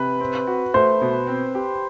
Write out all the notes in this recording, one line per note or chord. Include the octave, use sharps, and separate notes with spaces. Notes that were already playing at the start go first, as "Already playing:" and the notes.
Already playing: C3 B4
C4
F#4
A3 C5
B2
C4
G4